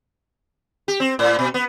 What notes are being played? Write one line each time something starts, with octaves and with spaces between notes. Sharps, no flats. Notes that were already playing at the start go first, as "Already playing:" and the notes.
G4
C4
A2
B2
B3